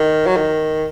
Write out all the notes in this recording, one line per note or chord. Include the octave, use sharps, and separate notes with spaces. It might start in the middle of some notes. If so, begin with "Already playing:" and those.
Already playing: D#3
F#3
D#3